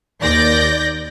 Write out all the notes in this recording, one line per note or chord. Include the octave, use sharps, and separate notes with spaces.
D#2 D5 G6 A#6